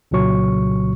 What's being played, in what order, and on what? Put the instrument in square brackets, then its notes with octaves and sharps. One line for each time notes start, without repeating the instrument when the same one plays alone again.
[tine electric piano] C2 A#2 C#3 F#3 C#6